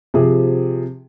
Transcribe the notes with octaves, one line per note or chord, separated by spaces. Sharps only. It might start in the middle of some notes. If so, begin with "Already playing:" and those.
C3 F3 G#4